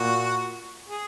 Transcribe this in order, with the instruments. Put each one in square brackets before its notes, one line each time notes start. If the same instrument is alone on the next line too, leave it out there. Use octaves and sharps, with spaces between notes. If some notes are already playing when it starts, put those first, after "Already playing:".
Already playing: [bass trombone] A#2 [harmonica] F#4
[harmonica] G#4